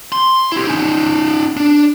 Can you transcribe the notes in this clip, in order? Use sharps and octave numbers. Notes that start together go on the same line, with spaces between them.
C6
E4 G4
C#4 D#4
D4